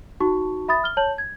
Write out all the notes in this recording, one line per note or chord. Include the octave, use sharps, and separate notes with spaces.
D#4 F#4 A5 C#6
E5 B5 D#6 A6
F6 G7
C#5 A5 G6 F#7
G#6